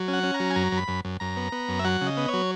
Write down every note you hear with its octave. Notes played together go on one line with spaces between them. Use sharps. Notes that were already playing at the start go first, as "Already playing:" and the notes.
Already playing: F#3
C#4
F#5
C#4
A#5
F#3
G#5
F#2 A#5
F#2
B5
F#2
F#2
F#2 A#5
B3
B3
F#2
E5
F#3 F#5
C#3
D#5
B3
C#5
F#3